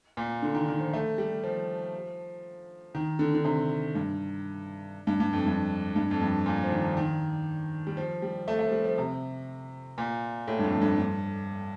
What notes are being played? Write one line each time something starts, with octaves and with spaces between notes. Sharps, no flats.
A#2
D3
D#3
D#3
F3
A3
G3
F3
D#3
D3
D3
C3
G2
G2
G2
F2
G2
G2
F2
G2
A#2
F3
D#3
D#3
G3
F3
G3
A3
A3
F3
G3
F3
C3
A#2
A2
G2
F2
G2
G2